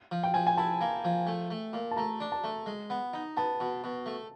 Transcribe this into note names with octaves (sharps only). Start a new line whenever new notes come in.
F3
G5
F3 G#5
G#5
E4 A5
A#3
F3
A3
A3
A#2
A5
A3 A#5
D4
A5
A3
G#3
B3
D#4
B3 A5
B2
B2
A3